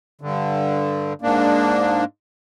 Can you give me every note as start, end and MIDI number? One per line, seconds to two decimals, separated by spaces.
0.21 1.13 43
0.21 1.13 50
1.22 2.04 44
1.22 2.04 58
1.22 2.04 62